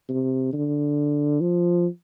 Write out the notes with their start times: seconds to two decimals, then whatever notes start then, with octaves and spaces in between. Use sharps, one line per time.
0.09 C3
0.53 D3
1.41 F3